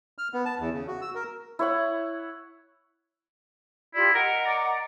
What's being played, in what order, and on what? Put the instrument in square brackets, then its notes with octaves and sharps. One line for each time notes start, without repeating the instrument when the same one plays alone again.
[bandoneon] F6
B3
A5
E2
C#3
F#4
E6
A#4
[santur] E4 C#5 F#5
[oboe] E4 [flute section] F4 G4 D5
[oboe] A#4 [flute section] D#5 F#5 A#5
[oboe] D5